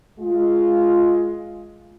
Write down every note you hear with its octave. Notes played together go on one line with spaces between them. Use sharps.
G#3 F4